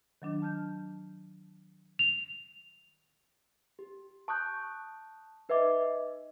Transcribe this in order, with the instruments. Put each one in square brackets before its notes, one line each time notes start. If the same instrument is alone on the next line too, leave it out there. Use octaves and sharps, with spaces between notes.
[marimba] D#3 F#3 D4
A5 F6 G6
[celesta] F7
[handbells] G4
A5 C#6 D#6 F#6 G6
D#4 B4 D#5 E5 D6